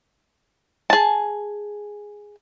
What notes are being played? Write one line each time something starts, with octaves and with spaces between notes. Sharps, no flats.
G#4 A5